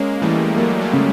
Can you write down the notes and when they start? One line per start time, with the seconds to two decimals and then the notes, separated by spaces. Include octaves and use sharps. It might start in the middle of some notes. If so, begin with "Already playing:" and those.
Already playing: G#3 A#3 C#4
0.22 E3 G3 A3
0.57 F#3 G#3 A#3
0.81 G3 A3
0.93 C#3